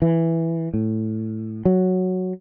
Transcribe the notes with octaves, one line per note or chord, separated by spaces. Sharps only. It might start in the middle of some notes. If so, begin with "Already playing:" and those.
E3
A2
F#3